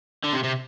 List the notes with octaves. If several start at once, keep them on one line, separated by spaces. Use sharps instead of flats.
D3
C3
C3